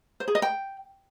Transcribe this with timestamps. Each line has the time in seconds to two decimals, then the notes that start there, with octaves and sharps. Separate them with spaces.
0.20 C5
0.28 G#4
0.35 D#5
0.42 G5